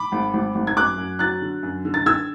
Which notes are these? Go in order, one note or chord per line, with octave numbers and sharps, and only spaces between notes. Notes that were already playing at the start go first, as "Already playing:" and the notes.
Already playing: B5 D6
G#1
G#1
G#1
G#6
F#2 D6 F#6
F#2
F#3 F#6 A6
D3
F#2
D3
A6
D3 E6 G#6